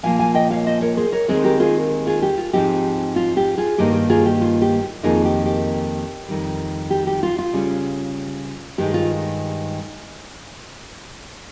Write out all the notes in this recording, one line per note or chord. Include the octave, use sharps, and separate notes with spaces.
A#2 F3 A#3 F5 G#5
F5 G#5
D#5 G5
C#5 F5
C5 D#5
A#4 C#5
G#4 C5
A#4 C#5
D#2 D#3 G#3 C4 G#4 C5
G4 A#4
F4 G#4
F4 G#4
G4
F4
G#2 F3 C4 D#4 G4
F4
G4
F4 G#4
G2 D#3 A#3 D#4 G4
G4
F4 G#4
G4
F4
G4
F2 D#3 A#3 D#4 F4 G#4
G4
G4
F2 D#3 G3
G4
G4
F4
F4
C#3 G3 C#4
G2 D#3 G#3 G4
F4